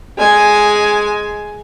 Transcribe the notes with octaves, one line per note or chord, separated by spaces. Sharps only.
G#3 G#5